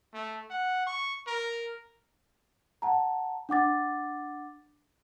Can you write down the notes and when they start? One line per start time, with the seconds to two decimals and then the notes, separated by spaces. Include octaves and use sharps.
0.14 A3
0.50 F#5
0.87 C#6
1.27 A#4
2.82 F#5 A5 A#5
3.49 D4 F#5 D6 A6